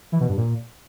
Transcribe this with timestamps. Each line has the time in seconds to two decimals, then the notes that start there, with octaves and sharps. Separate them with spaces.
0.12 E3
0.21 B2
0.29 G2
0.37 A#2